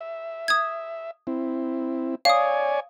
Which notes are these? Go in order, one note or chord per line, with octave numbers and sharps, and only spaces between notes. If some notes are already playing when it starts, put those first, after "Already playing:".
E5
D#6 G#6
C4 E4
C#5 D5 F5 G#5 D#6